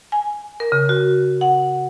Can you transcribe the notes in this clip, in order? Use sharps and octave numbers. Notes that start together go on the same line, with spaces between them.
G#5
A#4
C#3
F#4
F#5